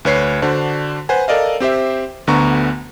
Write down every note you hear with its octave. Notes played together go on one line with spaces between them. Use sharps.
D2 B4 C#5 C7
D3 D4 F#4 C5
B4 C5 F#5 G#5
A4 A#4 D5 D#5 F5
C4 G4 C5 E5
D2 D3 B3 A#5 C#6